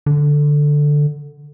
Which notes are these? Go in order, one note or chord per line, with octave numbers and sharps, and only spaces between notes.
D3